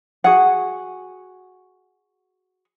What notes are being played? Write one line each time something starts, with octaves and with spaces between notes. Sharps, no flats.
F#4 G#4 F#5